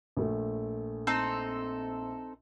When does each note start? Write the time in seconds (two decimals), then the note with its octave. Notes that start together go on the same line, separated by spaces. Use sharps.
0.17 A#1 A3
1.07 C4 D#4 A4